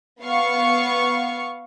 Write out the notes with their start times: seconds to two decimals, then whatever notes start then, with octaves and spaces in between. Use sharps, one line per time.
0.22 B3 F5 C#6